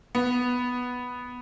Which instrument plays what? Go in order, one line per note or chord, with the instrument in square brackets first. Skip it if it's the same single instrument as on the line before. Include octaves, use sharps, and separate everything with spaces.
[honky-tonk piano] B3